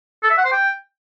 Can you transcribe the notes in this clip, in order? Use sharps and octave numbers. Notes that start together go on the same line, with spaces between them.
A4
E5
F#5
C5
G5